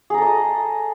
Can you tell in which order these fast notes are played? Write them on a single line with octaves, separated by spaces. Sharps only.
G#4 A#5 A4 D#5